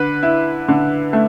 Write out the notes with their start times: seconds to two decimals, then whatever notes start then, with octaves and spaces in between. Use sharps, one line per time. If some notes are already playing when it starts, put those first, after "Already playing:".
Already playing: D3 B4
0.23 E4
0.68 D3
1.13 A3